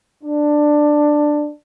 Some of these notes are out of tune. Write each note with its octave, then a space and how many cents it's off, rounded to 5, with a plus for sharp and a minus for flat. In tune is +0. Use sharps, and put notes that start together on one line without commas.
D4 +10